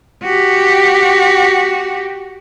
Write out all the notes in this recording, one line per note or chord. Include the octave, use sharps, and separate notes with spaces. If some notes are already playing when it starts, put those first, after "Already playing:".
F#4 G4